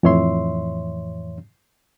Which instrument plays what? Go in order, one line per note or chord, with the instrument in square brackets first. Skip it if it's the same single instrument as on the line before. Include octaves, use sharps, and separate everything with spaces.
[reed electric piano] F2 A2 E3 C#5 E5 C6